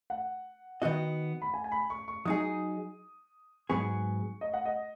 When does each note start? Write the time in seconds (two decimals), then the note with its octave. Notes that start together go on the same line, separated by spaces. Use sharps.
0.10 F#5
0.82 D#3 B3 F#4 D#5
1.42 B5
1.54 G#5
1.64 G#5
1.72 B5
1.90 C#6
2.08 C#6
2.25 F#3 D#4 G#4 D#6
3.70 G#2 F#3 B3 G#4 C#6
4.41 D#5
4.54 F#5
4.65 D#5